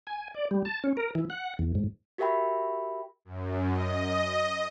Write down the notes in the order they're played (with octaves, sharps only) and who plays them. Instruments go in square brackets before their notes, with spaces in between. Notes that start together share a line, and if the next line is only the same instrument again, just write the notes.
[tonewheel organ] G#5
D5
G3
A5
C#4
A#4
E3
F#5
E2
G#2
[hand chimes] F#4 G4 A#4 E5 G5 B5
[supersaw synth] F#2
D#5